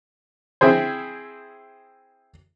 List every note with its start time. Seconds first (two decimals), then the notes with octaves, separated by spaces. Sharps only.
0.61 C4 E4 G#4 C5